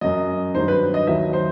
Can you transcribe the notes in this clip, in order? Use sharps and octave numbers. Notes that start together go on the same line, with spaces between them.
F#2 F#3 D#5
G2 D#3 F#3 C5
B4
D#5
D#2 D#3 F#3 E5
C5